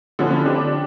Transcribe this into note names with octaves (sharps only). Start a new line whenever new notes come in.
D3 F3 C4 C#4 E4
C4 D4 G4